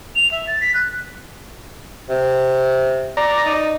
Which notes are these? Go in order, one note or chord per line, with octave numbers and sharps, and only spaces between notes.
F7
E5
A6
B6
F#6
C3
D5 A#5
D#4